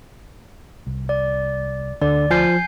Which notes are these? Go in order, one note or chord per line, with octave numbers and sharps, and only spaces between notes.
C2
D5
D2 D3 D5
F3 G#5 G6 C7